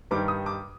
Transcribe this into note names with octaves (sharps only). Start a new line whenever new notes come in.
G2 D#3 G3 D6
D#6
D6